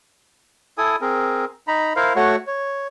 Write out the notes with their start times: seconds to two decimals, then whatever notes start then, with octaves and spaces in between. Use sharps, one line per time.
0.78 E4 A4 G#5 D#6
1.01 C4 G#4 A#4
1.68 D#4 A#5 B5
1.96 E4 A#4 C5 F5
2.16 A3 F#4 C#5 F#5
2.47 C#5